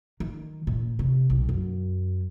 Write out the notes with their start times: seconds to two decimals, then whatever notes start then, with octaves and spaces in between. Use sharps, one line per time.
0.20 D#3
0.67 A#2
0.99 C3
1.30 B1
1.49 F#2